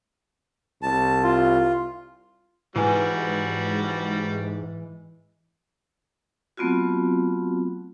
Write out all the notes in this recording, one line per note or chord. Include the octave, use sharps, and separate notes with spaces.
C2 A5
F4
G#2 E3 G3 G#3 E4 F#4 B4 G#5
F#3 A3 B3 C4 F4 F#4